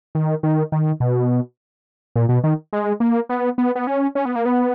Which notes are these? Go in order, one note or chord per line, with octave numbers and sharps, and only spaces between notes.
D#3
D#3
D#3
B2
A#2
B2
D#3
G#3
A#3
B3
B3
B3
C#4
C#4
B3
A#3
B3